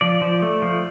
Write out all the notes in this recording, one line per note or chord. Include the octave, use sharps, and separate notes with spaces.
F3 D5
F3
A3
F3